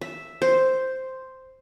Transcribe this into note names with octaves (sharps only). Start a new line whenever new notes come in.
E5
C5